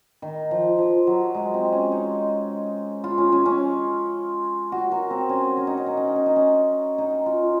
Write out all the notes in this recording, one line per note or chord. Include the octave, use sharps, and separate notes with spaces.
D#3
F3
F3
F#3
G#3
C4
C#4
D#4
F4
C#4
C#4
C#4
F#4
A#4
C4
C#4
C#4
D#4
C#4
D#4
C#4
D#4
C#4
D#4
C#4
D#4
F4